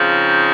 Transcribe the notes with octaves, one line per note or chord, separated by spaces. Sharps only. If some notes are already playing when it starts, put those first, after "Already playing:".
Already playing: C#3 F3 C4 D#4